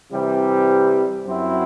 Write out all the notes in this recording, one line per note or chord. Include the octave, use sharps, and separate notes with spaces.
C3 E3 G3
F#2 F#3 C4 E4